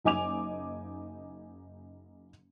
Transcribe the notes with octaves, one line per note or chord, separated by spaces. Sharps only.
F#1 D#4 G#5 D6 F7